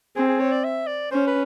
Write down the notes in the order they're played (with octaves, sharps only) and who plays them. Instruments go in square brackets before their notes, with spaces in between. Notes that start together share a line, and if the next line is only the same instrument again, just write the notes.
[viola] C4 [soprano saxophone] G#4
[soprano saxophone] G#4
C#5
D5
E5
D5
[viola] C#4 [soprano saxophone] C5
[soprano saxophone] B4